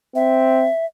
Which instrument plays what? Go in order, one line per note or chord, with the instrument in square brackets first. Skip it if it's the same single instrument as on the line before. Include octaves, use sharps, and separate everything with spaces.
[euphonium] C4 [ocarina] E5